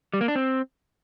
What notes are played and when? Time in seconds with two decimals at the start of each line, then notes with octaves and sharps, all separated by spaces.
0.14 G3
0.21 A#3
0.28 D4
0.35 C4